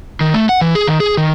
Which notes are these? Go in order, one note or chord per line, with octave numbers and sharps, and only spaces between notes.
D#3
A3
F#5
E3
G#4
D#3
G#4
D#3